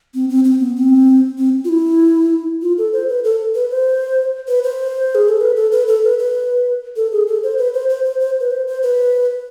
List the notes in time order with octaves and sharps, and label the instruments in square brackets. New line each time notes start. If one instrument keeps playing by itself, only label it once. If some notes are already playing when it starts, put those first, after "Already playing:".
[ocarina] C4
C4
C4
B3
C4
C4
F4
E4
F4
A4
C5
B4
A4
B4
C5
B4
C5
G#4
A4
B4
A4
B4
A4
B4
B4
A4
G#4
A4
C5
B4
C5
C5
C5
C5
B4
C5
C5
B4